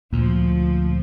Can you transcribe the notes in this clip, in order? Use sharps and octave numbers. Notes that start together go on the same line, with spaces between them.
D2 A#2 F3